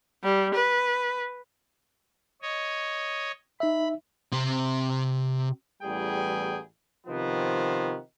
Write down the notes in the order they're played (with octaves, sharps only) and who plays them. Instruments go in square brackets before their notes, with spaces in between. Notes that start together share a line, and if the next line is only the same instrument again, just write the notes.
[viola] G3
B4
[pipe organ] C#5 D#5
[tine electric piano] D#4 E5 [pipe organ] B5
[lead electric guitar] C3 C4
[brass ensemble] A1 E2 G3 G#4 G5
C3 D#3 F3 B3 C4